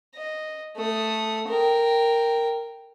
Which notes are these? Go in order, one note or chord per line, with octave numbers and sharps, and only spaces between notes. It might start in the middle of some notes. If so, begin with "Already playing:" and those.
D#5
A3 D#6
A#4 G5